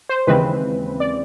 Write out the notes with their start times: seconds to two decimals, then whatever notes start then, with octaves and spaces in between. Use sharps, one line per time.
0.09 C5
0.27 D#2 C#3 E3 G#3 C4 B4
1.00 D5